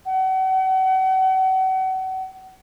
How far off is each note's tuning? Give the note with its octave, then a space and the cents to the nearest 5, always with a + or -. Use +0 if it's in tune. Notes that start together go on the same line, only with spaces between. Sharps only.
F#5 +35